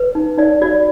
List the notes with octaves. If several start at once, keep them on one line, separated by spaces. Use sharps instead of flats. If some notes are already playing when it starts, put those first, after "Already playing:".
Already playing: B4
D#4
D#4 D5
F#4 D5